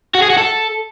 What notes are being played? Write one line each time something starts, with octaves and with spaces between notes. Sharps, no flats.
F#4
G#4
F#4
A4